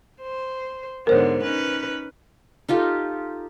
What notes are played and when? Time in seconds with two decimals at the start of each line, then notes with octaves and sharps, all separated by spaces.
0.22 C5
1.07 G#2 D3 B3 A#4 C5 C#5
1.43 C#4 D#4 B4
2.68 D#4 F4 G4 A4